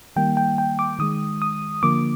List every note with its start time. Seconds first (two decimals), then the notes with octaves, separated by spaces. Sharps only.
0.16 D#3 G3 A#3 G5
0.37 G5
0.58 G5
0.79 D6
0.99 D#3 G#3 D#6
1.42 D#6
1.83 D3 F3 A#3 D6